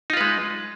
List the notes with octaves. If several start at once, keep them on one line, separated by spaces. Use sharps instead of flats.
G#3 D#4 F4 B4